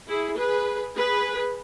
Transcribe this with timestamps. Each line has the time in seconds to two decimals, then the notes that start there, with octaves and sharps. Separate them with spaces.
0.08 E4 G#4
0.37 G#4 B4
0.96 G#4 B4